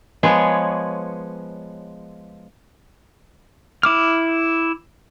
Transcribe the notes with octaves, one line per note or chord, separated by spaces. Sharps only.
F3 G#3 B3 G#4 C#5
E4 D6 F6